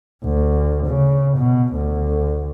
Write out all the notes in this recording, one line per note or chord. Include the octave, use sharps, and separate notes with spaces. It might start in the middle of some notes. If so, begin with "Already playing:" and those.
D2
C#3
B2
D2